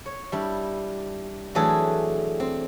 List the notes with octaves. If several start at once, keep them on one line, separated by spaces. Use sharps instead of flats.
C#5
G3 D4 E4
E3 F#3 A3 D4 G#4 A4
C4